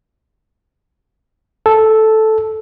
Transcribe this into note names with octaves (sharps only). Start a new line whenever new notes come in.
A4